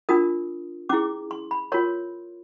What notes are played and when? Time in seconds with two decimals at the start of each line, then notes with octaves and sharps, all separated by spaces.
0.09 D4 F4 A#4 D#6
0.89 C#4 E4 G#4 D6
1.31 C6
1.51 B5
1.72 F4 A#4 C#5 C6